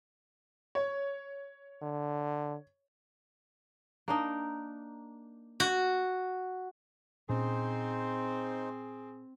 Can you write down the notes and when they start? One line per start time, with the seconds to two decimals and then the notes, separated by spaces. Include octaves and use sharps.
0.75 C#5
1.82 D3
4.08 A#3 D4 D#4
5.60 F#4
7.29 A#2 C4 C#4 D#4 G#4 C5